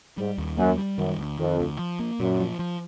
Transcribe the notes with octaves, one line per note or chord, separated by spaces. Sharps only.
G#2 G3
D#2
F#2 A#3
G3
F#2 D#3
D2
F2 D#3
D2
F3
A#3
F#2 A#2
F3
F3